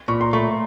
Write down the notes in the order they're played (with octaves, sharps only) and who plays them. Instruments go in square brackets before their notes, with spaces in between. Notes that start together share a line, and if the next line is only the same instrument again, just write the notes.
[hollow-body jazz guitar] A#2 [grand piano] B5 C#6
[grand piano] A#5 C6
[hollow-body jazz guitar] A3 [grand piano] B5 C#6